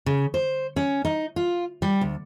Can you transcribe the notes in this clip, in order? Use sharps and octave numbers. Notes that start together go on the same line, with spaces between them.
C#3
C5
C#4
D#4
F4
G3
D2